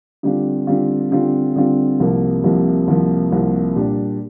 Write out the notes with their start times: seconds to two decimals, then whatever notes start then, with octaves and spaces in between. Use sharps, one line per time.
0.23 D3 G3 C4 F4
0.67 D3 G3 C4 F4
1.11 D3 G3 C4 F4
1.56 D3 G3 C4 F4
2.00 C2 C3 F3 A#3
2.44 C2 C3 F3 A#3
2.88 C2 C3 F3 A#3
3.32 C2 C3 F3 A#3
3.76 A#2 G3 D4